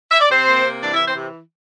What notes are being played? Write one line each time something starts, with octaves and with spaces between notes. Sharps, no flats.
E5
D5
C3 C4 C5
A#3
C3
E3 D4 D5
E3 E4 E5
C4 C5
C3